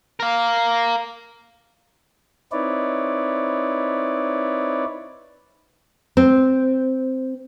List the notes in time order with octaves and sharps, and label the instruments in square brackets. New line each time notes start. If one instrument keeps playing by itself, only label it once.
[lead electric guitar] A#4 F5
[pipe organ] C4 D#4 E4 B4 C#5 D5
[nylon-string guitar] C4